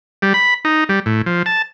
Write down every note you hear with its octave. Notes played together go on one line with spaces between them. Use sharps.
G3
B5
D#4
G3
A2
F3
A5